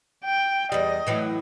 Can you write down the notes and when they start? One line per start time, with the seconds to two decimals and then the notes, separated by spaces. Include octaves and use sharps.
0.24 G5
0.72 E2 G3 D#5
1.07 A2 E3 F#3